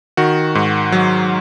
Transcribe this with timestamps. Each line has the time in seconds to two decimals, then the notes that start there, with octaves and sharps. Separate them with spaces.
0.17 D#3 F#4
0.55 G#2
0.92 F#3